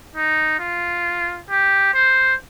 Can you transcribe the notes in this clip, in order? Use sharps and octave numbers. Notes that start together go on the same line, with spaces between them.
D#4
F4
G4
C5